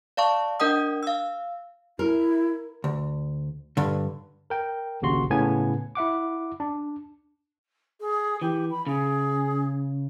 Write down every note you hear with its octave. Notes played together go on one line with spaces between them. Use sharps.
D5 F5 A5 C#6
D4 A#4 D#5 F#5 D#6
F5 E6
E4 A#4
D2
G2 D3
A#4 G5
A#1 D#2 C#3 F#4 C6
A2 C#3 B3 G#5 G#6
E4 E5 F#5 D6
D4
G#4
E3 G4
B5
C#3 G#4